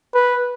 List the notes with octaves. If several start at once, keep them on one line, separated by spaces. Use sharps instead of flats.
B4